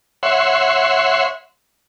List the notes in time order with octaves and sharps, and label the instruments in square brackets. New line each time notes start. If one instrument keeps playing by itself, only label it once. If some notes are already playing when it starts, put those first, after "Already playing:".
[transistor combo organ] C#5 E5 F#5 C6